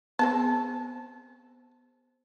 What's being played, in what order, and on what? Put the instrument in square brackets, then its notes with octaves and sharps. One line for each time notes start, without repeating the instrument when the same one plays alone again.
[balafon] B3 [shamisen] C4 G#4 A5